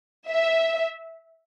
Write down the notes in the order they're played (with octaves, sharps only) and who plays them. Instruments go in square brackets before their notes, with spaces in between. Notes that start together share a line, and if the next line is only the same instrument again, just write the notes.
[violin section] E5